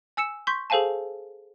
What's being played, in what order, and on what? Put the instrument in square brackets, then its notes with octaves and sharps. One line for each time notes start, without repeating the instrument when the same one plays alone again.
[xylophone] G#5 E6 C#7 E7
C6 C#6 G6 B6
G#4 A4 C5 F5 G#5 A5